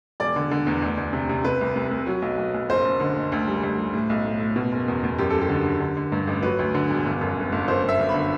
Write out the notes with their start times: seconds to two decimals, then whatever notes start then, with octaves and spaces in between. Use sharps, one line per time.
0.20 E1 D5
0.36 D3
0.51 D3
0.67 E2
0.82 D2
0.97 D2
1.13 C3
1.29 C3
1.45 C3 B4
1.61 C2
1.76 C2
1.91 C2
2.06 F#3
2.22 B1
2.38 B1
2.54 B1
2.69 F#1 C5
2.85 F#1
3.00 D3
3.16 F#1
3.32 D2
3.47 G3
3.63 D2
3.78 G3
3.94 A2
4.10 B1
4.25 A2
4.40 A2
4.56 B2
4.72 F#1
4.88 E2
5.04 E2
5.18 F#2 G4
5.30 F#1 A4
5.41 G4
5.49 D3
5.66 D3
5.80 D3
5.97 D3
6.12 G2
6.27 A1
6.43 F#3 B4
6.59 D2
6.74 D3
6.90 E1
7.06 G1
7.21 F#2
7.37 G1
7.52 G1
7.68 F#2 C5
7.83 G1
7.89 E5
7.99 G1
8.09 B5
8.14 D3